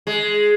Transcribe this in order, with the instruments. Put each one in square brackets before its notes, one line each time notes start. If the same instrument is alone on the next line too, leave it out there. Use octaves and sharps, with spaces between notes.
[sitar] G#3